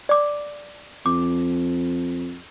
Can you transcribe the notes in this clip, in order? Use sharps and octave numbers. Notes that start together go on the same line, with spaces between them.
D5 D6
F2 D6